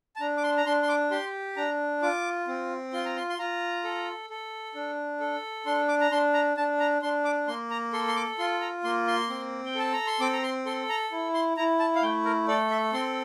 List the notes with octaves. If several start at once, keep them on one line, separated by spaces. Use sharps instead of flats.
A5
D4 A#5
D6
C6
A#5
D4 C6
C6
D6
G4 C6
D4 A#5
F4 D6
C4
F4 C6
A#5
C6
C6
F4 A#5
A4
A4
D4
A4
D4 C6
D6
A#5
D4 C6
A#5
D4 A5
A#5
D4 C6
D6
A#3 C6
A#5
A4 C6
C6
D6
F4 C6
A#5
A#3 C6
C6
C4
G5
A4 A5
A#5
C6
C4 D6
A#5
C6
A4 C6
A#5
E4
C6
E4 A#5
A5
F5
A3 G5
A#4
A4 D5
E5
C4 C6